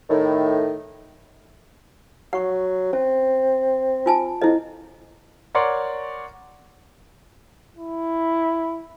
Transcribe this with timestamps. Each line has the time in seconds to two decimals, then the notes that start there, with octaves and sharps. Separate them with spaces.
0.10 A2 D#3
2.33 F#3 F#5 C#6
2.93 C4 C#4
4.06 F4 G#5 A5
4.41 F2 E4 D#5
5.55 A#4 C#5 D5 F#5 C6
7.77 E4